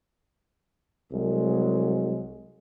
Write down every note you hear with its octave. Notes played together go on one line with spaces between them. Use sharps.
C2 F#3 G#3